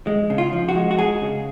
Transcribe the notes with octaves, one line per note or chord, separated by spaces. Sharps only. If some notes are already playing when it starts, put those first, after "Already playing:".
G#3
C#3
F4
F3
F#4
G#3
F#4
G#3 G#4
C#3